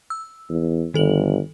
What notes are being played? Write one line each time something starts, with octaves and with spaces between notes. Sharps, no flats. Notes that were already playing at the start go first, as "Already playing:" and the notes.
E6
E2
G1 D#3 A4 F#7